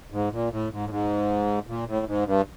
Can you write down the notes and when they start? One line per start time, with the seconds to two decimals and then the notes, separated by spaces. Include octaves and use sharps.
0.11 G#2
0.31 A#2
0.51 A2
0.70 G#2
0.85 A2
0.89 G#2
1.67 A#2
1.87 A2
2.06 G#2
2.25 G2